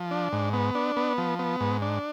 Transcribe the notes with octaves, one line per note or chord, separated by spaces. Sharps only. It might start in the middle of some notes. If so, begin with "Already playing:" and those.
Already playing: F3
D4
G#2
B3
D4
B3
F3
B3
G#2
D4